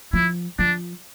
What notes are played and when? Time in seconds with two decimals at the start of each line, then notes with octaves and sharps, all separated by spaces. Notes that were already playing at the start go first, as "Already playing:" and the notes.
0.13 F3 E4
0.59 F3 D4